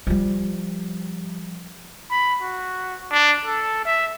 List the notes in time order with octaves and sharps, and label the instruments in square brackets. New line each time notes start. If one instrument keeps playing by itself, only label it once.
[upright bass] F3 G3
[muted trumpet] B5
F#4
D4
A4
E5